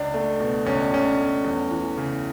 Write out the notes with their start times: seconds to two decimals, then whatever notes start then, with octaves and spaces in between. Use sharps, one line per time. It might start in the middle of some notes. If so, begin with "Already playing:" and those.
Already playing: C#2 D4
0.14 A3
0.40 B2
0.66 C#2 C#4
0.80 D4
0.92 C#2 C#4
1.19 A3
1.44 E2
1.71 E3
1.97 C#3